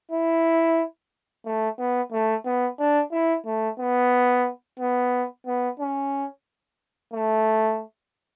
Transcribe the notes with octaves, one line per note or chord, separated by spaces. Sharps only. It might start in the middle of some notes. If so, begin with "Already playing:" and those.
E4
A3
B3
A3
B3
D4
E4
A3
B3
B3
B3
C#4
A3